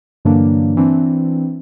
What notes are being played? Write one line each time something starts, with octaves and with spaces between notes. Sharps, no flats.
G2 D3 E3 F#3 A#3 D4
E3 C4 D4